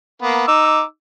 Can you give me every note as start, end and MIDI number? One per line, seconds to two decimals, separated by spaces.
0.22 0.45 58
0.22 0.45 59
0.48 0.82 63
0.48 0.82 86
0.48 0.82 88